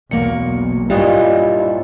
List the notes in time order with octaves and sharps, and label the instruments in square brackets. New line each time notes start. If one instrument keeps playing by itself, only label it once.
[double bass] B1 B2 [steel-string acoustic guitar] E2 A#3 [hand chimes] C#7
[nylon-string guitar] G2 A#2 [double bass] D4 E4 [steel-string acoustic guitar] F4 C#5 D#5 [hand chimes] G4